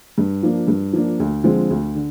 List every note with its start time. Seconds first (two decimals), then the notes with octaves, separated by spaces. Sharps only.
0.18 G2
0.43 F3 A#3 D4
0.68 G2
0.93 F3 A#3 D4
1.20 D2
1.44 D3 F3 G#3 C4
1.70 D2
1.95 D3